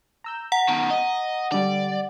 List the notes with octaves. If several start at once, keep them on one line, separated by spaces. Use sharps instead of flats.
A#5 E6 G6
F#5 A#5
B2 D#3
D#5
D3 G3 D5